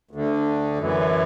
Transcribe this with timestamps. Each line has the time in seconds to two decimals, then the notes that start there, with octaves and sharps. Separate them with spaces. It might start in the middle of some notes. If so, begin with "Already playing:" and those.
0.11 D2 D3
0.78 F#2 E3